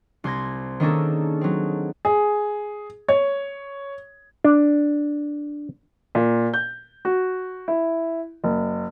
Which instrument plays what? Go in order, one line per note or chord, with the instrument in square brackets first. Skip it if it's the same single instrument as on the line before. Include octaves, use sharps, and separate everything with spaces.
[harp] C2 C6 G#6 A#6
D#3 A#3 C#4 D4 G#4 A4
F#3 C4
[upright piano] G#4
C#5
[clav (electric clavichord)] D4
[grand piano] A#2
G6
F#4
E4
F#1